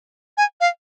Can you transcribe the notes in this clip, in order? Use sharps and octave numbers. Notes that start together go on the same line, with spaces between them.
G#5
F5